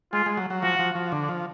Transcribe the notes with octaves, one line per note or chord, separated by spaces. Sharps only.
G#3 F4
G#3
F#3
F#3
F3 F#4
F3
F3
D3
F3